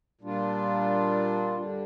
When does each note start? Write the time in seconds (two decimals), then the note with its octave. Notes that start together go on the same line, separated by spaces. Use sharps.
0.21 A#2 G3 D4 F4
1.56 G2 D3 G3 D4